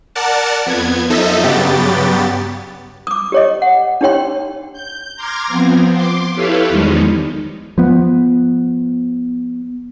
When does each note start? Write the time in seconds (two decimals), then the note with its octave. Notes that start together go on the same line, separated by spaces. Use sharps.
0.15 A#4 D5 F#5 A5
0.66 F2 B3 G#6
1.09 F#2 F3 D#4 A4 D#5 E5
1.42 G2 C#3 F#3 B3 G4 A6
3.07 D6 D#6
3.32 G4 C#5 D#5
3.62 F#5
4.01 D4 D#4 G4 C#5 G5 C6
4.73 G6
5.16 A#5 C6 D6 F6 G#6 A#6
5.48 F3 B3 C4
5.92 C6 D6
6.35 E4 G4 A4 B4 C#5 F5
6.69 E2 D#3 F3 G3 G#3 D#4
7.78 F3 B3